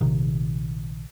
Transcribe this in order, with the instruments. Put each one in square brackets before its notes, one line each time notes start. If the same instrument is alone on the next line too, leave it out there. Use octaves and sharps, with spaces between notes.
[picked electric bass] A#1 C3 D#3